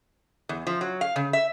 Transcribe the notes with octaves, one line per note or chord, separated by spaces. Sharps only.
E2
F3
F#3
F5
C#3
E5